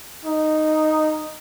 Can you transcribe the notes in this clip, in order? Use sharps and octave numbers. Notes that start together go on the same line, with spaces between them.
D#4